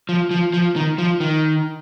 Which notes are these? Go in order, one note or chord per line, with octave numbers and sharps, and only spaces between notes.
F3
F3
F3
D#3
F3
D#3